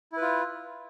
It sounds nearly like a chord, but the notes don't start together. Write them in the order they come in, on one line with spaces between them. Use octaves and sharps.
E4 B4 F4